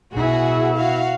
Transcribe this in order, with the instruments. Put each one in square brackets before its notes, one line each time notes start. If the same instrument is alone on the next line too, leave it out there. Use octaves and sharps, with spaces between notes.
[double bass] B2 E4 [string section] F#4 G#4
[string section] F#4 F5